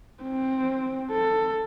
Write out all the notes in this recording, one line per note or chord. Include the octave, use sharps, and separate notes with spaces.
C4
A4